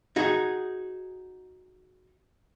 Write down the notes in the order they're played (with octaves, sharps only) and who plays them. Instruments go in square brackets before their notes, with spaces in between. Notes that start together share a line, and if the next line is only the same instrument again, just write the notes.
[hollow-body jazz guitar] D#4 F#4 G#4